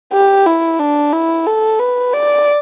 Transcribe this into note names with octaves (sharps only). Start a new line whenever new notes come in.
G4
E4
D4
E4
A4
B4
D5